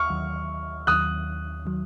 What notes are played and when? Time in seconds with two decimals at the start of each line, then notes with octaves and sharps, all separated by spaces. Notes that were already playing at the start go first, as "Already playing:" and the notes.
Already playing: D#2 C#6 F6
0.10 D#2 D#3 F#3
0.87 D#2 D#3 F#3 D#6 F#6
1.65 D#3 F#3